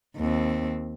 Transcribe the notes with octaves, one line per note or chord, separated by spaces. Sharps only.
D#2 C4